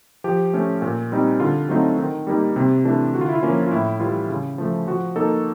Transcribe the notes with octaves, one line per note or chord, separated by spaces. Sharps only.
F3 G4
A3 C#4
A#2
G3 C4 D#4
D3 F4
F#3 A3 C4 D#4
D#3
G3 A#3 D#4
C3
E3 A3 D4
D3 F#4
F4
E4
F4
F3 A#3 C#4
F4
A2 E4
E3 G3 F4
C#3
F3 A3
F3 F#4
A#3 D#4 A4